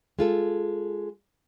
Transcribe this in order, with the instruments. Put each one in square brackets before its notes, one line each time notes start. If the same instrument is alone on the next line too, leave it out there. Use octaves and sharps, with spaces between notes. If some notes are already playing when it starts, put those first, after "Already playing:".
[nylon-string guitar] G#3 F4 A4